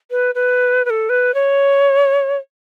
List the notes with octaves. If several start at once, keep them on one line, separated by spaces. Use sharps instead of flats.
B4
B4
B4
A4
B4
C#5